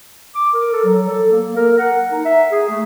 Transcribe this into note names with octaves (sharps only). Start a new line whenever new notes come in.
D6
A#4
A4
F#3
A4
A#3
A#4
F#5
D#4
E5
G#4
A3